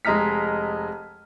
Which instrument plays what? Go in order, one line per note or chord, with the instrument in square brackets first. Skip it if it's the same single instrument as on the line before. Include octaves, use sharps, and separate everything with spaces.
[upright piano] F1 G#3 D#5 A#5 F6 B6